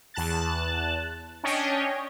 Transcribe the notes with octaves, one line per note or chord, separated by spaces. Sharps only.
E2 A5 F#6 A6
C#4 D4 C#5 D#5 G5